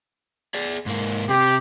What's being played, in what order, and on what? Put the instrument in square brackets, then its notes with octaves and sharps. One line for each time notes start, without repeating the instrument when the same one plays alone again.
[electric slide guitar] G#4 D5
G#2 A#3
[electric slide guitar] C3 [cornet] G4